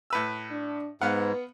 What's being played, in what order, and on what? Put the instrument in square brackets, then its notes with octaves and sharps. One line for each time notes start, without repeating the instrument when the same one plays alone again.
[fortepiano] A2 B4 E6
[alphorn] D4
[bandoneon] G#2 [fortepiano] B3 F5 F#5 [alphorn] B4